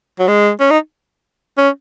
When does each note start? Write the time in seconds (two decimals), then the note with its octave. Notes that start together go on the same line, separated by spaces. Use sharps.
0.20 F#3
0.28 G#3
0.60 C#4
0.71 D#4
1.58 C#4